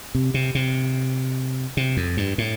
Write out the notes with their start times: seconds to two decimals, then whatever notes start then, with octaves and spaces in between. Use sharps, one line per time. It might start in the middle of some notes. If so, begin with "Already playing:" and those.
0.15 C3
0.34 C3
0.55 C3
1.77 C3
1.97 F2
2.17 G2
2.38 A2